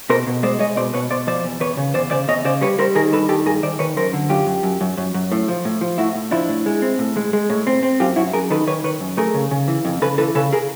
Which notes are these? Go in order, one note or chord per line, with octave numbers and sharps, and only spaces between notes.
B2 A#4 C5
B2
G#3 C5 D5
G#3 C#5 D#5
B2 C5 D5
B2 B4 C#5
B2 C5 D5
F3 C5 D5
E2
E2 B4 C#5
C#3
E2 C5 D5
C#3 C5 D5
E2 C#5 D#5
C#3 C5 D5
G3 B4 C#5
G3 A#4 C5
D#3 G#4 A#4
G2 A4 B4
D#3 G4 A4
G2 G#4 A#4
D#3 C5 D5
D#3 B4 C#5
F#2 A#4 C5
D3
F#2 F4 G4
F#2
F#2
F#2
F#2
F#2
A2
F3
A2
F3
A2 E4 F#4
A2
F3 D4 E4
A2
G#3
C4
A2
G#3
G#3
A2
C4
C4
F#2 F4 G4
F#2 E4 F#4
F#2 G#4 A#4
D#3 A4 B4
D#3 B4 C#5
D#3 B4 C#5
F#2
A3 G#4 A#4
C#3
C#3
E3
F2
C#3 A4 B4
E3 A4 B4
C#3 A4 B4
G#4 A#4